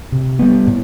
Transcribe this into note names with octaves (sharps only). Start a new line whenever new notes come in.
C3
G3 B3
A2